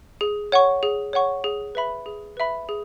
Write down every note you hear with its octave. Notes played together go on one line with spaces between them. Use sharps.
G#4
C#5 F#5 C#6
G#4
C#5 F#5 C#6
G#4
B4 E5 B5
G#4
B4 E5 B5
G#4